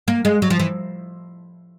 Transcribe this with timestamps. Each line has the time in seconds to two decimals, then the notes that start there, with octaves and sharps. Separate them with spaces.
0.08 A#3
0.25 G#3
0.42 F#3
0.50 F3
0.59 E3